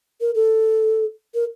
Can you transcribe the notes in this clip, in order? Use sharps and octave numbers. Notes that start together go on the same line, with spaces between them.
A#4
A4
A#4